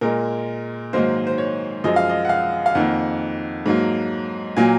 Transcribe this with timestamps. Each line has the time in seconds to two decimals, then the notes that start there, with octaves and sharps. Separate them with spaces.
0.01 A#2 G#3 A#4
0.93 G#2 D#3 F#3 A#3 C5
1.27 C5
1.38 C#5
1.84 F#2 F3 G#3 D#5
1.96 F5
2.09 D#5
2.25 F#5
2.29 F5
2.66 F5
2.75 F2 D#3 A#3 F#5
3.66 G#2 F#3 A#3
4.57 A#2 F#3 A#3 G#5